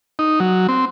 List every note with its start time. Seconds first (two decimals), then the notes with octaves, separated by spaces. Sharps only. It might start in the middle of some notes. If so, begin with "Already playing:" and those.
0.19 D#4
0.40 F#3
0.69 C4